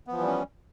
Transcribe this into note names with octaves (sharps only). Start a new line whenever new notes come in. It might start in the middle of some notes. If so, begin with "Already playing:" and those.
E3 F3 G3 B3 C#4